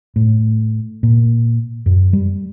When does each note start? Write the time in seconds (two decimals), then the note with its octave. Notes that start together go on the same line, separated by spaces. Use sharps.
0.16 A2
1.03 A#2
1.86 F#2
2.13 G3